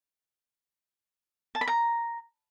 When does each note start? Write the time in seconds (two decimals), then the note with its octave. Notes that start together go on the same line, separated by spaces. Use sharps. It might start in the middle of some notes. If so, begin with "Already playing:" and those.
1.55 A5
1.61 B5
1.67 A#5